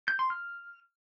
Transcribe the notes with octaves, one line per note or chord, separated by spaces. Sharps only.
G6
C6
F6